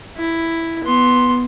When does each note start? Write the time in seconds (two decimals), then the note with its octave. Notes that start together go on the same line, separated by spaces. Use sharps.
0.17 E4
0.84 B3 C6